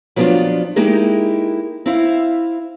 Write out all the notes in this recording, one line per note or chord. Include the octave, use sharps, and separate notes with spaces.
F3 F#3 A#3 B3 D4 F4
G#3 A#3 D#4 E4 G4
C4 E4 F5